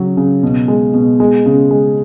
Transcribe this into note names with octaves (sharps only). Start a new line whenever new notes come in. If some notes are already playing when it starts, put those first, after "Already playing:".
Already playing: C#3 F#3
C#3
B2
G#3
B2
G#3
C#3
G#3